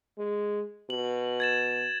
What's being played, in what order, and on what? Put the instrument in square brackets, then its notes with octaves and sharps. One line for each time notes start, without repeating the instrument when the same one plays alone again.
[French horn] G#3
[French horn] B2 [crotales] F#7
[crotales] G#6 A6 E7